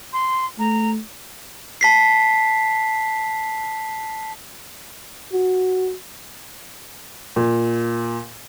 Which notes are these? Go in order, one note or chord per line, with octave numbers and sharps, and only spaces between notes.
C6
A3 A#5
A5 B6 C7
F#4
A#2